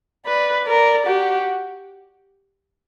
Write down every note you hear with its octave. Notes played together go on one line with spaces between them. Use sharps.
B4 D5
A#4 D5
F#4 G4